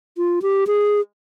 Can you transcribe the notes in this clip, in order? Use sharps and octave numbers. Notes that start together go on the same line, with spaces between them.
F4
G4
G#4